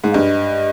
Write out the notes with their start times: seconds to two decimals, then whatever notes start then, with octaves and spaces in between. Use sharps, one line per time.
0.04 G#2
0.11 F5
0.14 G2 D#5